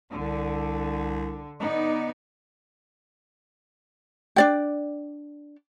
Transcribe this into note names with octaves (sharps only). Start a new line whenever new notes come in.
C2 D3
B3 D#4 D5
D4 D5 G5